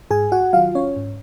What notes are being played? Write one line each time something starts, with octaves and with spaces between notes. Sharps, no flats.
G#2 G#4 G#5
F#4 F#5
D#3 F#3 F4 F5
C#4 C#5
G#2